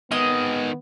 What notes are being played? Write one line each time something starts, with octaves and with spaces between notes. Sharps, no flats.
D#3 G#3 B3 D#5